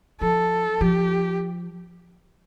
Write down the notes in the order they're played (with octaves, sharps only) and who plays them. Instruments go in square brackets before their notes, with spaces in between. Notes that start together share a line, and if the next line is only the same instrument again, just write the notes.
[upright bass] F3 [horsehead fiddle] A4
[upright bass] F3 [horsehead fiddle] G4